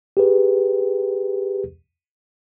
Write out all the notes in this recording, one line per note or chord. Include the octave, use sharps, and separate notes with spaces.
G4 G#4 B4